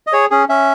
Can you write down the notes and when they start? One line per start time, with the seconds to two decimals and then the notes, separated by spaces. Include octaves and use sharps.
0.07 D#5
0.13 G#4 C#5
0.30 C#4 G#4
0.49 C#4 E5